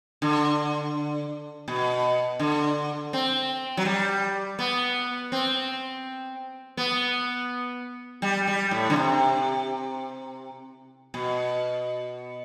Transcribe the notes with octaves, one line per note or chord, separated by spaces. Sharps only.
D3
B2
D3
C4
F#3
G3
B3
C4
B3
G3
G3
A2
D3
C3
B2